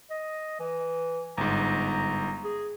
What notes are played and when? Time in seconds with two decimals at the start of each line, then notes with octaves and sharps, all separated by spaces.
0.11 D#5
0.60 E3
1.38 G1 G#2 A#5
2.44 G#4